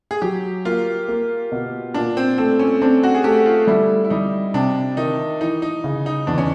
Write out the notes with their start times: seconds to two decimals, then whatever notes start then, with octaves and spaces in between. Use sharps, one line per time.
0.11 G#4
0.22 F#3 G4
0.65 A#3 F4
1.08 A#3
1.52 B2
1.94 A#2 D4
2.17 C4
2.38 A3 C4
2.59 C#4
2.82 C4 D4
3.03 F#4
3.15 G#4
3.24 A3 G4
3.46 F4
3.67 G3 E4
4.05 E4
4.10 G3 D#4
4.54 C3 D4
4.97 D#3 D#4
5.41 E3 D#4
5.62 D#4
5.84 C#3
6.06 D#4
6.27 E2 D4
6.38 C#4